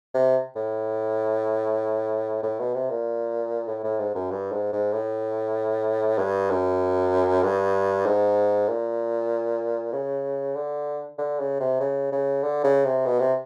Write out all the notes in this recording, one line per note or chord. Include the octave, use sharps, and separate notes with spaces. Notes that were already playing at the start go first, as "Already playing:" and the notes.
C3
A2
A2
B2
C3
A#2
A2
A2
G#2
F#2
G2
G#2
G#2
A2
G2
F#2
G2
G#2
A#2
C#3
D3
D3
C#3
C3
C#3
C#3
D3
C#3
C3
B2
C3